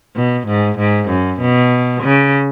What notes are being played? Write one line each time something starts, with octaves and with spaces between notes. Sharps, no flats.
B2
G#2
G#2
F#2
B2
C#3